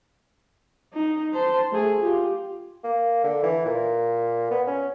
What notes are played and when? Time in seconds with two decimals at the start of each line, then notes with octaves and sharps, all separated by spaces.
0.94 D#4
1.33 C5 A5
1.72 A3 G#4
2.01 F4 G4
2.84 A#3
3.24 D3
3.43 E3
3.66 A#2
4.51 B3
4.67 C#4